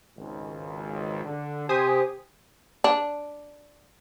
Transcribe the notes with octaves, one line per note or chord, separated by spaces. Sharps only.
G#1 C#2
D3
C3 G4 C5 G5 G#5 D#6
D4